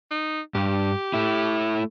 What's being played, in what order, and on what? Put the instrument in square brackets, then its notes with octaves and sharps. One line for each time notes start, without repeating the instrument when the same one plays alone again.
[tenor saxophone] D#4
[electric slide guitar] G2 [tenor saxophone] G4
[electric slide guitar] A3 E4